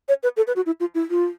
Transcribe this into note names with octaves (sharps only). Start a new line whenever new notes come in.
C#5
B4
A4
B4
F#4
E4
F4
E4
F4